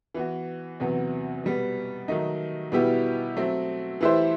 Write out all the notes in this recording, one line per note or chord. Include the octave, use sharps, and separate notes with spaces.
E3 B3 F#4
E2 C3 F#3 B3
B2 G3 B3
D#3 F#3 A3 D#4
B2 G3 B3 E4 G4
F#3 A3 C4
E3 A3 E4 G4 C5